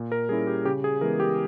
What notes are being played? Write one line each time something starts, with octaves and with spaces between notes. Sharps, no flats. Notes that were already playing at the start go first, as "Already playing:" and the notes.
Already playing: A#2
A#4
G3 C#4 E4 G#4
G4
C#3 G4
G#4
E3 G#3 B3 A#4
G4